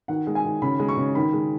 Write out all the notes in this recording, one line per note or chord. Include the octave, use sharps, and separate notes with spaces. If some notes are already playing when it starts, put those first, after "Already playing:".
D#3 F#5
G#3
G#5
D#3
C#3 B5
G#3
C#6
C#3
D#3 B5
G#3